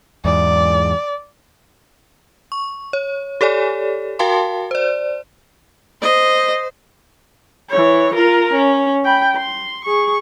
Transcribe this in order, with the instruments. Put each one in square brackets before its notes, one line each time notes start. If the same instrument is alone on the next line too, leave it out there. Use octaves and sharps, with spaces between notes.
[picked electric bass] E2 G#2 [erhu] D5
[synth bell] C#6
C#5
G4 A4 C#5 D5 G#5
F#4 A#4 F5 G5 A5 C6
C5 D5
[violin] C5 [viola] D#5
[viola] E3 C#5
F4 A#4
C#4
G5 B5
C6
G#4 C#6